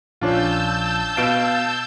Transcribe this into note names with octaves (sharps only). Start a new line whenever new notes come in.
A#1 C#4 D4 F4 A5 E6 G6
B2 F5 D7